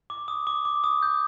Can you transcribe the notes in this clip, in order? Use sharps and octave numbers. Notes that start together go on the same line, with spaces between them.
D6
D#6
D6
D6
D#6
G6